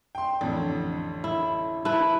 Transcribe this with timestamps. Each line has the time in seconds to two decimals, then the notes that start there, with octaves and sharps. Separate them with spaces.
0.15 G5 C6
0.41 A1 F2 D3
1.24 E4
1.85 E4 B4 A5 F#6